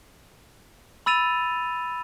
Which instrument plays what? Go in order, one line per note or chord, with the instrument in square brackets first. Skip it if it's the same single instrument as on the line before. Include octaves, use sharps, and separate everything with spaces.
[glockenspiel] B5 E6 A6 D#7 F7